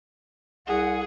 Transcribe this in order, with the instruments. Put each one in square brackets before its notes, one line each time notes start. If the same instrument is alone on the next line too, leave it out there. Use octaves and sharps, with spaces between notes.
[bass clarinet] C2 [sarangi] G#4 [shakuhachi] F#5